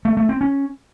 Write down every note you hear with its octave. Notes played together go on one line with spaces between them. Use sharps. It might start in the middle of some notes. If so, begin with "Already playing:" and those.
A3
A3
C4
C#4